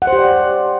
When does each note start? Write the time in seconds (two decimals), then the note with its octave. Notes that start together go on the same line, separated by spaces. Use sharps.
0.02 F#5
0.07 C5
0.13 G4
0.18 D5